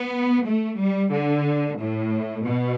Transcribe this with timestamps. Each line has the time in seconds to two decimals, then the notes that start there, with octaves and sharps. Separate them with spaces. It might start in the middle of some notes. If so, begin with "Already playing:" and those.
Already playing: B3
0.46 A3
0.79 G3
1.12 D3
1.79 A2
2.45 B2